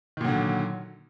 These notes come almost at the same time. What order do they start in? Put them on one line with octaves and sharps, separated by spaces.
D#3 A#2 F#3 D3